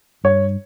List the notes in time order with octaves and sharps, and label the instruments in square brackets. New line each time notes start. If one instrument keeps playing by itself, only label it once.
[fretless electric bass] G2 [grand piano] C#5